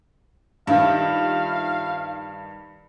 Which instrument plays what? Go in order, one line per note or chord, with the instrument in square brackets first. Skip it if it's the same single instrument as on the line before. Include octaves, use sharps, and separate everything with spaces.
[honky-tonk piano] G2 D#3 [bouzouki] F3 E4 F4 [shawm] F5